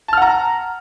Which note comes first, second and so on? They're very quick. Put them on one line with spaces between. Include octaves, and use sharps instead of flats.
A5 F6 F#5 A#5